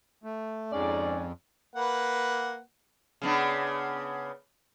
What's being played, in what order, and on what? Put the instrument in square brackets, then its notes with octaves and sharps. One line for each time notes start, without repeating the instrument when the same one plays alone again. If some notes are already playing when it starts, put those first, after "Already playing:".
[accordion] A3
[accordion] F2 [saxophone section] G#2 G#4 D5 [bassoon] C#4
[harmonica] A#3 B4 F#5
[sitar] C#3 B3 D4